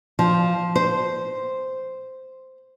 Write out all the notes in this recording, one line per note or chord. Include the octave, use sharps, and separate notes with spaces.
F3
C5